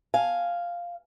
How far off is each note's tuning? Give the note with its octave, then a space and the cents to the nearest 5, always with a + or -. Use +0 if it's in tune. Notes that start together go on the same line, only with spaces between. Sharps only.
F5 +0 G#5 +0